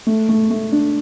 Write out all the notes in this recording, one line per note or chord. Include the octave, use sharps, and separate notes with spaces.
A3
A3
A3
D4